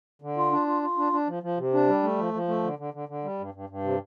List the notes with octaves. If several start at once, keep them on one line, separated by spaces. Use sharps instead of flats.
D3
F4
D4
F4
F4
D4
D4
F3
F3
C3
D4
G3
A3
F3
F3
A3
D3
D3
D3
D3
G3
G2
G2
G2
C3